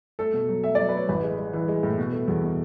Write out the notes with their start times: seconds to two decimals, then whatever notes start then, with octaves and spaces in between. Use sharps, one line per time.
0.19 A3 A4
0.33 B2
0.49 F#3
0.64 A3 E5
0.75 F#3 D5
0.89 B4
0.94 A3 C#5
1.09 A1 B4
1.23 G#3
1.39 G#3
1.53 E3
1.68 G#3
1.83 A2
1.98 B2
2.13 A3
2.28 E2
2.43 B2